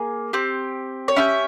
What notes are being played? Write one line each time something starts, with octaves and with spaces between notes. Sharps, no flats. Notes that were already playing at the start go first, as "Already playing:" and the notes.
Already playing: A#3 G#4
C4 G4
C#5
C#4 E4 G4 E5